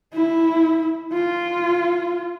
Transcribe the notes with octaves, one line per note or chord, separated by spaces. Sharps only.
E4
F4